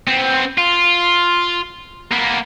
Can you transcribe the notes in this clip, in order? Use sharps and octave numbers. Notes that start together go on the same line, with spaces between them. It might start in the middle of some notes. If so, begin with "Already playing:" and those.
B3 C4
F4
A#3 B3